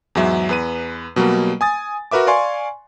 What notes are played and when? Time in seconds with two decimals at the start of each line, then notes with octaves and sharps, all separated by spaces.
0.15 E2 G#2 F#3 E5
0.49 E2 B4 D#7
1.16 B2 F#3 G3 A#3
1.61 G#5 D#6 A6
2.11 F#4 A#4 B4 E5 D6
2.27 D5 F5 G#5 C6 C#6